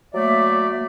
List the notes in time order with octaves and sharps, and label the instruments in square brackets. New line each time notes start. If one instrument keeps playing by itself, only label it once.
[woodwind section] F#3 A3 A#3 D5 E5